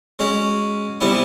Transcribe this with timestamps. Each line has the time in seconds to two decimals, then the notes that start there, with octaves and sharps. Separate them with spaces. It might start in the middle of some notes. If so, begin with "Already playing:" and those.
0.19 G#3 C#4 F#4
1.01 C3 E3 G3 B3 E4